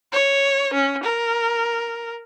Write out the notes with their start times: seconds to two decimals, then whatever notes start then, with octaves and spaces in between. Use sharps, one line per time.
0.12 C#5
0.74 C#4
1.04 A#4